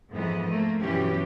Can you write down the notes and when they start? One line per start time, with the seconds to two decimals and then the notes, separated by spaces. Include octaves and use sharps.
0.12 F2 G#2 E3 B3 D#5
0.49 A3 A#3
0.81 G2 B2 E3 F#3 C#4 G4